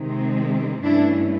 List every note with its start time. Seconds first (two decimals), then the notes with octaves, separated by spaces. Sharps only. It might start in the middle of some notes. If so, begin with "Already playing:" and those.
Already playing: C3 D#3 G#3 C4
0.83 G2 E3 A3 C#4 D4 E4